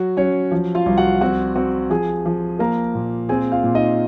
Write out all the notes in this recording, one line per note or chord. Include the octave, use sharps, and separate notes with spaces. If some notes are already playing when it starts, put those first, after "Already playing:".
Already playing: F#3 F#4
F#3 C#4 C#5
F3
F4 F5
C2
F#4 F#5
C4 F#4 F#5
C4 F#4 F#5
F3 G#4 G#5
F3
A#3 A#4 A#5
A#2
C4 G#4 G#5
F4 F5
A#2
D#4 D#5